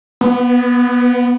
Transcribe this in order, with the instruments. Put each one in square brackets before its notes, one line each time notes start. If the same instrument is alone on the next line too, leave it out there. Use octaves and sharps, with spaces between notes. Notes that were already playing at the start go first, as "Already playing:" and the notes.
[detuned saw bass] B3